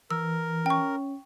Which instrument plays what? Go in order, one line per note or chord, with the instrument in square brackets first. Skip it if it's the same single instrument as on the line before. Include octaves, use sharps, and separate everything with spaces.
[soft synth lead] E3 [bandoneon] A#4 [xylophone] E6
[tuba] C#4 [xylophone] G5 C#6